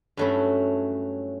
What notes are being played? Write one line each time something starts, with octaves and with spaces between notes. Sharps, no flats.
G2 F#3 A3 C#4 E4